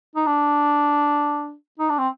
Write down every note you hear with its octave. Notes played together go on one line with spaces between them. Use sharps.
D#4
D4
D#4
D4
C4